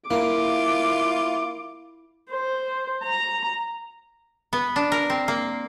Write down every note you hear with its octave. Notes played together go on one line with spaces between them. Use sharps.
A#3 E4 F4 D6
C5
A#5
B3
D4
A#4
C4
A#3